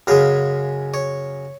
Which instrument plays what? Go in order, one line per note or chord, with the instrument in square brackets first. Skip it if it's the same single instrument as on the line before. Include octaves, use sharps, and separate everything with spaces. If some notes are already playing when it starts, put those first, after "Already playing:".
[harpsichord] F#2 C#3 G#3 F5
C#5